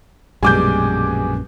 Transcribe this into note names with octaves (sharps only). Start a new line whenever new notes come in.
A#1 F#2 B2 G3 G#3 G#5 D6 G6